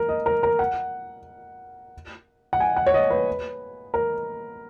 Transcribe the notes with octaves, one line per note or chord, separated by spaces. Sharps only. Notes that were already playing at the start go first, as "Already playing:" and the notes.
Already playing: A#4
D#5
A#4
A#4
F#5
F#5
G#5
F#5
C#5
D#5
B4
A#4